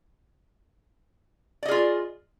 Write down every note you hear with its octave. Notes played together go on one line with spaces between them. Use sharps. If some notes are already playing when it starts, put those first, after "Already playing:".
F4 G#4 D5 D#5